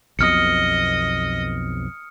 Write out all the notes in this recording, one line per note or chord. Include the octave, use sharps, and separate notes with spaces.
B1 F2 B2 D#5 D#6 F6 C#7